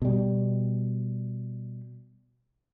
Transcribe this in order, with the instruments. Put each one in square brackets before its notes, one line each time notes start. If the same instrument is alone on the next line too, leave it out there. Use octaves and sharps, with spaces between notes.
[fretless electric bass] B2 G3